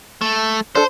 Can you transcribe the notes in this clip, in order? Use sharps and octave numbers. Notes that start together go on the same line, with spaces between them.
A3
D4 A4 C5